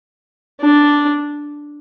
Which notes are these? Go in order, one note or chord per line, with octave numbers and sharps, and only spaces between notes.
D4